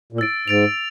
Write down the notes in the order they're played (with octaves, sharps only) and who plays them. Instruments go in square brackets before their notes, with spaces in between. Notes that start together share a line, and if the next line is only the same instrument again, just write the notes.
[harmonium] A#2
[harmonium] A2 [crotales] E6 A6 D7
[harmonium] G#2 [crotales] A6 D7 F7